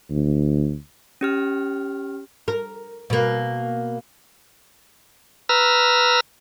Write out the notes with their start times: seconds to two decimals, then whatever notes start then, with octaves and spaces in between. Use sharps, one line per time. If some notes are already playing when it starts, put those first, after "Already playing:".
0.10 D2
1.21 C#4 G4 F6
2.48 A#4
3.10 B2 A#3
5.49 B4 A#5 E6 F6